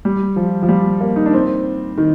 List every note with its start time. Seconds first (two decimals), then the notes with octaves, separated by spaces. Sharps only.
0.05 G3
0.36 F3
0.63 F3
0.69 G3
1.01 A#3
1.16 D#4
1.26 D4
1.33 C4
1.98 D#3